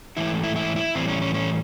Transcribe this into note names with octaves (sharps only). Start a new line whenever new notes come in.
G#2 E3 A3 E4
E4
E4
E4
A2 E3 G3 C4
C#4
C#4
C#4